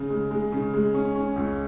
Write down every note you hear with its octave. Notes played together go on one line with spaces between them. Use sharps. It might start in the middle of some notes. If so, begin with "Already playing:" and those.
Already playing: C#3
G#3
G#3
C#3
G#3
C#4
C#4
C#2